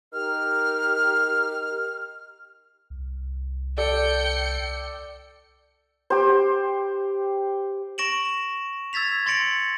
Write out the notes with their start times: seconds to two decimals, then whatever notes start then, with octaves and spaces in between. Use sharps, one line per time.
0.13 D#4 G4 A#4 F6
2.90 C2
3.78 A4 D5 G5 C#7
6.10 G4 C5
7.98 C#6 A#6 D7 E7 F#7
8.93 E6 G#6 A6 B6 F7
9.26 C6 A6 A#6 C#7 D7 F#7